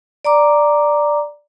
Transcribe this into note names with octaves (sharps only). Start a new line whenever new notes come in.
D5 A#5 D6